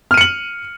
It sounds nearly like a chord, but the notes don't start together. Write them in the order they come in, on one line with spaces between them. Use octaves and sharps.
F6 D#7 C#7 F#7